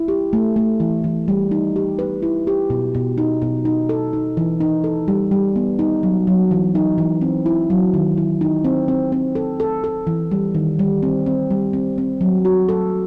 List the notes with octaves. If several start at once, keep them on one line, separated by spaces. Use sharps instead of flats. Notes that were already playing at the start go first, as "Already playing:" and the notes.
Already playing: E4
G4
A3
A3
E3
E3
G3
D#4
G4
B4
E4
G4
B2
B2
D#4
B2
D#4
A4
D#4
E3
D#4
A4
G3
G3
B3
D#4
F#3
F#3
E3
D#4
E3
C4
E4
F#3
D#3
E4
D#4
C4
C4
C4
A4
A4
A4
E3
G3
D#3
G3
C4
C4
G3
C4
C4
F#3
F#4
A4